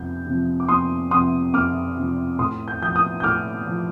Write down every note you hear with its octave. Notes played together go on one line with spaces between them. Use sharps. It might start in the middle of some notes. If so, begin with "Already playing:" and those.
Already playing: F2 C3 F3 G6
C3 F3
D6
F2 C6 D#6
C3 F3 C6 D#6
F2 D6 F6
C3 F3
A2 C6 D#6
G6
F3 D#6 G6
D#6 G6
G6
A2 D6 F6
F3